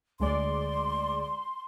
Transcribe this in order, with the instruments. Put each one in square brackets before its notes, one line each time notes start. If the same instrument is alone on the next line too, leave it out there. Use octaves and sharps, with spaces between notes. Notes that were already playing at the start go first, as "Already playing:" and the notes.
[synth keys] D2 G#3 D5 [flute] C6